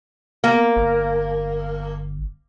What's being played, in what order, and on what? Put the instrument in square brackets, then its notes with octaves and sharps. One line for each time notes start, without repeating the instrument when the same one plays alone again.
[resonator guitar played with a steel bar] A#3
[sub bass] G1